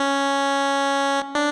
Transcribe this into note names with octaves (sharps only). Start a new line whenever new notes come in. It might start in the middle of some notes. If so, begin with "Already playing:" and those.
Already playing: C#4
D4